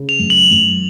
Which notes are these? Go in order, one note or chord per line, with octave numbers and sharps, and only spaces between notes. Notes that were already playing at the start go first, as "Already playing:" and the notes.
Already playing: C#3
F7
F#2
F#7
F#2